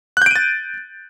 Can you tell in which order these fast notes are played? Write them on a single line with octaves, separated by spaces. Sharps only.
F#6 G6 D7 D#7 A6